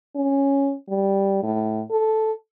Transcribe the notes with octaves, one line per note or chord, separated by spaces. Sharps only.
C#4
G3
A2
A4